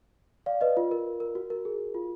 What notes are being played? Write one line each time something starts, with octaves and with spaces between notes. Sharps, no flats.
D5 F5
B4 D#5
F4
A#4
A#4
F#4
A#4
G#4
F4